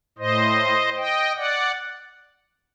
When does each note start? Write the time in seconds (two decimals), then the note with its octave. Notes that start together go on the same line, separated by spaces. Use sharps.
0.18 A2 C5 D#5
0.97 D#5 G5
1.36 D5 F#5